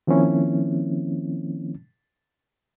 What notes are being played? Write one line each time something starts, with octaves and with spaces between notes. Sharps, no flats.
D#3 F3 A#3 C4 C#4 E4